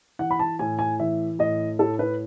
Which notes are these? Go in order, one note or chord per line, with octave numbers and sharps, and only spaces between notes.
E3 F#5
B5
A5
A2 G#5
G#5
E3 E5
A2 D#5
A2 A4
B4